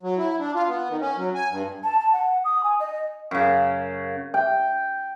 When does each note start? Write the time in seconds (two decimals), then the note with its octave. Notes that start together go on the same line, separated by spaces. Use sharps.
0.03 F#3
0.18 E4
0.40 D4
0.55 F4
0.68 B3
0.90 D#3
1.01 C#4
1.17 F#3
1.35 G#5
1.50 G2
1.84 A5
2.00 A5
2.13 F#5
2.45 D#6
2.64 G#5
2.80 D#5
3.31 F#2 C#3
4.34 G5